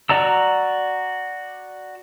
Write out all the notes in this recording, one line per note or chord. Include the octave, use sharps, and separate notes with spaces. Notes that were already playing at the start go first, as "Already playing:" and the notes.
F#4 D5 A#5 E6